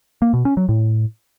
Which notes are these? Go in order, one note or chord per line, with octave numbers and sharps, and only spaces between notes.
A#3
B2
C#4
F#3
A2